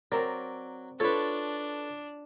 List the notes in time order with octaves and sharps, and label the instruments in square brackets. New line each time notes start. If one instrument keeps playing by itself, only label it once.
[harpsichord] F#3 [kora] C4 A#4 D5
[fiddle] D4 [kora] F4 C#5 [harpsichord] A4 B4